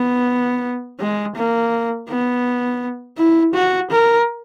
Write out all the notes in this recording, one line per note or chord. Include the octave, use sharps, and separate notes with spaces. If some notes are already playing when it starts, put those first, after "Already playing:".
Already playing: B3
G#3
A#3
B3
E4
F#4
A#4